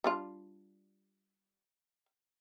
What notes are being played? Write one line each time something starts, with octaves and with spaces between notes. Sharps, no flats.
G3 D4 F4